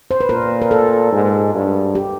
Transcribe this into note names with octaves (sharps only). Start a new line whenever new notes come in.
C5
B4
A#2 A#4
A#4
A4
G#2
G2
G4